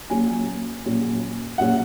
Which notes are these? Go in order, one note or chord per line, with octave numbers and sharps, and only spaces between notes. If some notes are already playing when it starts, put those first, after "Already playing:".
A#1 A#2 F#3 C#4 G#5
A#1 A#2 F#3 C#4
A#1 A#2 F#3 C#4 F#5